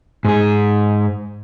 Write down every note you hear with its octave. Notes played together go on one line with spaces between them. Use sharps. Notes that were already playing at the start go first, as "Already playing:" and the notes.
G#2 G#4